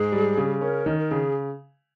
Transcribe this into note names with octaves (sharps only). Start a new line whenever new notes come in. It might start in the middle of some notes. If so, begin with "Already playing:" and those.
Already playing: G#2 G#4
G3
C#3
C#4 A#4
D#3
A#4
C#3 G#4